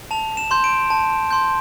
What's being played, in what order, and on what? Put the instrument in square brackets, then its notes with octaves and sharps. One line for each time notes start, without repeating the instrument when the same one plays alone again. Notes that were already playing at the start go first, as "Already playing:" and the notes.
[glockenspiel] A5 F7
E7
C6 G6
D7
A5
C6 G6